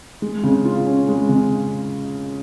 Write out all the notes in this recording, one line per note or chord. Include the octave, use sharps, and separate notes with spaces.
G#3
C#3
F4
C#4
G#3
C#3